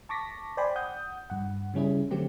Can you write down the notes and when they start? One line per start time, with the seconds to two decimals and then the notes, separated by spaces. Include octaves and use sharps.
0.09 A5 C#6 D6 A#6 B6
0.57 C5 D5 G5 G#5 B5 C6
0.75 F#5 D#6 G6
1.30 G2 F#5
1.74 C#3 G3 C#4 E4 G#4
2.11 D3 F#3 A3 C4 G4